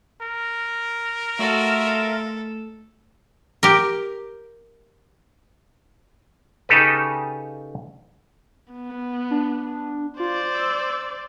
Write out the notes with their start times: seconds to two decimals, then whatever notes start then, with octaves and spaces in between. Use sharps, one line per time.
0.22 A#4
1.39 A3 F4 F#4 A4 E5
1.85 A4
3.63 G4 A#4
6.69 C#3 D#4 G4 A4 B4
8.73 B3
9.31 D4
10.20 F4 C5 D5
10.54 E6